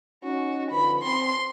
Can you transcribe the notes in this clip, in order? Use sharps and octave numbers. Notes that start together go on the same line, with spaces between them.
C#4 D#4 F#4
D3 F3 B4 B5
C4 C6